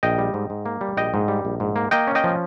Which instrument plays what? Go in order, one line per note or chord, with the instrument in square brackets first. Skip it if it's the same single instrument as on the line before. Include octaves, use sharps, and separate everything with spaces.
[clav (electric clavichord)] A#1 D#5 G5
G3
G#2
G#2
A#3
G3
A#1 D#5 G5
G#2
G3
A#1
G#2
A#3
A#3 D#5 G5
C#4
D#5 G5
F3